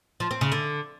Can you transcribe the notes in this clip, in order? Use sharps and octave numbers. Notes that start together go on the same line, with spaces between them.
F3
C4
C#3
D3